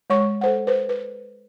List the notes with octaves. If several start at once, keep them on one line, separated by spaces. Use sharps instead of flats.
G#3 C#5 C#6
A4 C5 F#5
B4 C5
B4